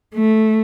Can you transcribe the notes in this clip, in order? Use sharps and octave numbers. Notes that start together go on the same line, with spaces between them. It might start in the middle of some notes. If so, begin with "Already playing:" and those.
A3